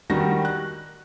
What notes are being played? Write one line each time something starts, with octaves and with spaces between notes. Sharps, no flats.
D#3 G3 F#4 A#6
F#6